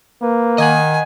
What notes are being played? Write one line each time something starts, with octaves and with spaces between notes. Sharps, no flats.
A#3 B4
D#3 D#5 F#5 G#5